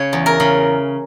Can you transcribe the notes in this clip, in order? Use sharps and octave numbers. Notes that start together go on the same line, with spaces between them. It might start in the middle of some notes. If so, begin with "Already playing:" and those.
Already playing: C#3 C#5
E2
A#4
C#3